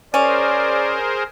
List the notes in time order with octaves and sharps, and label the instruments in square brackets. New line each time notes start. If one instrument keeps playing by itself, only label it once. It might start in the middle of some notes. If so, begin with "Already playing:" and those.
[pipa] C#4 [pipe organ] G#4 A#4 C5 [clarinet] D5